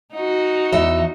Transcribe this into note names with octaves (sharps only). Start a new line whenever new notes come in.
D#4 F#4
E2 D#5 E5